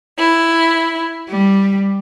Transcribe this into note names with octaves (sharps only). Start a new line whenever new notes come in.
E4
G3